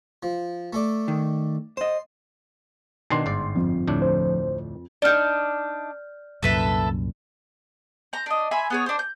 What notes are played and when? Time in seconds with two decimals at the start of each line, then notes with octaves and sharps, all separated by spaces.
0.23 F3
0.73 A3 A4 D5
1.08 D#3
1.77 C5 D#5 C6
3.10 B2 D#3 D4 C6 C7
3.26 G1 G#2 D5
3.55 F2 F3
3.87 D2 A2 D4
4.02 C5
5.02 D4 D#4 D5 F6 G6
6.43 C2 F#2 A#2 A4 B4 E5
8.13 C5 A#5
8.26 D4 D#5
8.51 E5 G#5 B5 C6
8.70 B3 G#4 C#5
8.86 D4 C5
8.99 G6